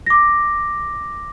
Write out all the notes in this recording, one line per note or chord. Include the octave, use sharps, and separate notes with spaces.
D6 A#6